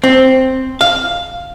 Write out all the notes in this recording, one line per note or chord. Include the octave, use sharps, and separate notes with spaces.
C4
F5